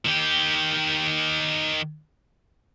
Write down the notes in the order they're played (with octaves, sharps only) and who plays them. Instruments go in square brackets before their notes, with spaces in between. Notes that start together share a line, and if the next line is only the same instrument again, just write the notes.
[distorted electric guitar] D#3 G4